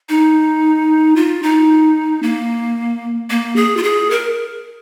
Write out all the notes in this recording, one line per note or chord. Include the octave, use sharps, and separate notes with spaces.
D#4
F4
D#4
A#3
A#3
G#4
F4
G#4
A#4